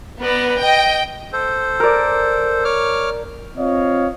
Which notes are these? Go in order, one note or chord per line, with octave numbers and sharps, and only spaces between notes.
B3 B4 D5 A#5
D#5 G5
A4 C5
A#4 D5
C#5 D6 F6
C4 F4 C#5 D#5 F5